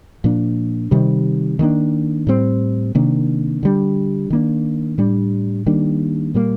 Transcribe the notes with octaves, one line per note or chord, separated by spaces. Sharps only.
A#2 F3 A#3 D4
C3 D#3 G3
D#3 G3 A#3 D4
A2 G3 C4
C3 D#3 A#3 D4
D3 G3 D4
D#3 A#3 D4
A2 G3 D4
D#3 G3 A#3 D4
A#2 G3 A#3